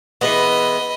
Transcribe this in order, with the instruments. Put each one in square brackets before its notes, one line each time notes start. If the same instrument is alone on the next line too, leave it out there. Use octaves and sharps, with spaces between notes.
[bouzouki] E3 G#3 B3 [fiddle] D#5 B5